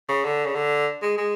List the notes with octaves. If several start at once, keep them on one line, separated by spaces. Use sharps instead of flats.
C#3
D3
C#3
D3
G#3
G#3